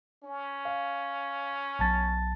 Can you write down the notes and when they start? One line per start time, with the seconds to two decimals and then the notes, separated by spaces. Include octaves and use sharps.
0.23 C#4
0.65 F5
1.79 B1 A5 A6